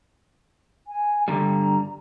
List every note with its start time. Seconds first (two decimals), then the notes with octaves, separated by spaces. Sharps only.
0.87 G#5
1.28 G2 D3 G3 A#5